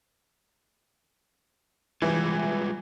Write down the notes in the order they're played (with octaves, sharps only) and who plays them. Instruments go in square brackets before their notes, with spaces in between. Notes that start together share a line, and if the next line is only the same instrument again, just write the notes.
[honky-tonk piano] E3 [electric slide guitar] G3 G#3 F4